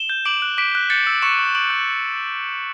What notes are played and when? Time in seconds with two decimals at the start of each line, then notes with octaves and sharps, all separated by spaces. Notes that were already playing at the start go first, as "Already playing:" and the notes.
Already playing: E7 G7
0.09 G6
0.25 D6 D7 F#7
0.42 F#6
0.58 D6 B6 D7
0.75 F#6
0.90 G6 A6 C#7
1.07 E6
1.22 C#6 C#7 E7
1.39 C#6
1.55 D6 D7 F#7
1.70 F#6